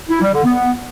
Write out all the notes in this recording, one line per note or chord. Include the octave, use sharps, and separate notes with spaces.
E4
G3
D3
B3